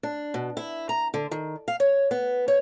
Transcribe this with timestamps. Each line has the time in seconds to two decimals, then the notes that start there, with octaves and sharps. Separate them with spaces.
0.03 D4
0.34 B2
0.57 E4
0.89 A#5
1.14 D3
1.31 D#3
1.68 F5
1.80 C#5
2.11 B3
2.48 C#5